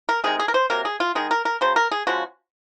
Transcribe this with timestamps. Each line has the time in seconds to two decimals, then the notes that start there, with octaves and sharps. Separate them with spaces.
0.09 A#4
0.24 C3 D#3 G#3 G#4
0.39 G#4
0.48 A#4
0.54 C5
0.70 C3 F#3 A#3 A#4
0.85 G#4
1.00 F4
1.15 D#3 G#3 G#4
1.31 A#4
1.45 A#4
1.61 C#3 F#3 C5
1.76 A#4
1.91 G#4
2.07 C#3 F3 G#3 F#4